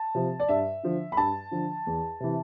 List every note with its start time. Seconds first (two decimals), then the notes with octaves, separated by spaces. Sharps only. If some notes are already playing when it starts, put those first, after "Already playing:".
Already playing: A5
0.15 C3 F3
0.40 D5
0.49 G2 E5
0.83 D3 F3
1.12 B5
1.17 G2 A5
1.51 D3 F3
1.87 E2
2.20 C3 E3